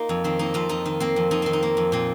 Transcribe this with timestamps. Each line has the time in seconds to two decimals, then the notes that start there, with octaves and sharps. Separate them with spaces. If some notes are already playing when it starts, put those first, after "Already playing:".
Already playing: A#3 D#4 F4
0.09 F2
0.24 D#3 C4
0.39 A#3 D#4
0.54 F2 F4
0.69 F2 D#4
0.86 D#3
1.00 A#3 C4
1.16 F2
1.31 F2 D#4
1.42 D#3 C4
1.53 D#4
1.63 A#3
1.77 F2
1.92 A#2 C4